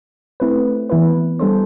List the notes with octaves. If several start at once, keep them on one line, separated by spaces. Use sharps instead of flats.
A3 C4 E4 B4
E3 B3 E4 B4
G3 B3 D4 A4 C5